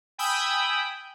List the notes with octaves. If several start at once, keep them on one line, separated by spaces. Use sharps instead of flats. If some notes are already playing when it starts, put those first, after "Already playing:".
G5 G#5 B5 D#6 E6 G6